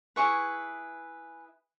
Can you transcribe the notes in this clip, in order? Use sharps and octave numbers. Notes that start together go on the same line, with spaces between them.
E4 G#4 B4 C#6